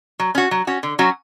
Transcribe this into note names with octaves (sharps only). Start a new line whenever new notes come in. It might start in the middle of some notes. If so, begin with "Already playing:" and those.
F#3
C#4 F#4
F#3
C#4 F#4
D3
F#3 C#4 F#4